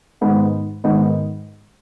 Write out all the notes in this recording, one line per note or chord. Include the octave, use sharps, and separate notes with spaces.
G#2 D#3 B3 D#4
G#2 D#3 B3 D#4